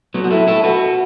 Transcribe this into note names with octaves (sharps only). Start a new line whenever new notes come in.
F#3 B3
F#4
E4 A4
E4 A4
F#4 B4